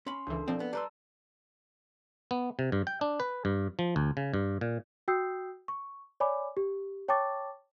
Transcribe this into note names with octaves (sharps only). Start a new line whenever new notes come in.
C#4 B5 C6
C#2 E3 D4 A4 A#4
B1 F3 C4 D5
B3
G3 B4 A5 A#5 C6 E6
B3
C3
G2
G5
D4
B4
G2
F3
D2
C#3
G2
A#2
F#4 G5 D#6 E6 G6 C7
C#6
C#5 D5 G#5 B5 D6
G4
C#5 G5 A5 C#6 D6 A6